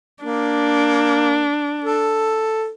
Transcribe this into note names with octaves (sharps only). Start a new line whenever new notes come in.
A#3 D4
A4